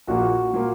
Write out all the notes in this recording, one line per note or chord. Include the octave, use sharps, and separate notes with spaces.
A#1 A#2 A#3 F#4
A#2 A#3